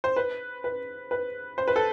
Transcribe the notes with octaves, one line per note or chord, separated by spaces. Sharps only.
C5
B4
B4
B4
C5
B4
A4